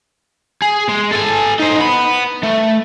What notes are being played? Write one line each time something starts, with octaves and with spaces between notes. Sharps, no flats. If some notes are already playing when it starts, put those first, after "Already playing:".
G#4
G#3
A4 G#5
D#4 C5
B3 B5
A3